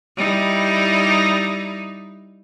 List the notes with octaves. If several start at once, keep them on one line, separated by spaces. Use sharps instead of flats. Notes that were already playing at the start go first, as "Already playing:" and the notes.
G3 D#4 E4